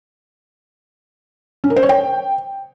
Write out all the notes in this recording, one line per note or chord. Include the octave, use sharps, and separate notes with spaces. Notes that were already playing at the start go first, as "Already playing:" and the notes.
C#4
A#4
C5
C#5
G5